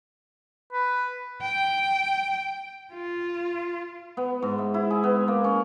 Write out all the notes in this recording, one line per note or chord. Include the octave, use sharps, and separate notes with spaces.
B4
G5
F4
B3
G#2
E5
E4
G#4
B3
A#3
C#4